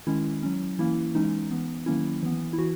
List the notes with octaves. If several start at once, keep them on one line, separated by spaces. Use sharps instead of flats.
D#3 G#3 C#4 E4
F#3 C#4
E3 A#3 C#4 E4
E3 G#3 C#4 D#4
E3 B3
D#3 F#3 A#3 C#4 E4
E3 B3
E4
E3 F#4